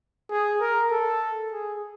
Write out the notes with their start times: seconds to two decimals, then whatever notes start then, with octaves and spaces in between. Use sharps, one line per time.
0.30 G#4
0.61 A#4
0.91 A4
1.52 G#4